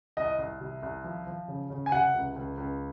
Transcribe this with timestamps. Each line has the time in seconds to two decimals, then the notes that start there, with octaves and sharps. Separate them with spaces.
0.17 C2 D#5
0.39 C2
0.60 C3
0.83 C2
1.04 F3
1.27 F3
1.48 C#3
1.70 C#3
1.86 G#5
1.92 C3 F#5
2.14 C#2
2.36 C#2
2.58 C#2